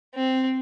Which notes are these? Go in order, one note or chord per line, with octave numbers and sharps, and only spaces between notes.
C4